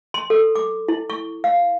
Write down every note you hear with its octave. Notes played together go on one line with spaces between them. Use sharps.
C6
A4
D6
E4
C#6
F5